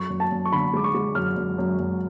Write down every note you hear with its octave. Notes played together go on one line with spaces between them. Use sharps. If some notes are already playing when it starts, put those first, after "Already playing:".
Already playing: F#2 C#6
F#2
A5
F#2
C#6
D3 B5
G#3 D6
C#6
G#3
F#2 F6
F#2
F#2
F#2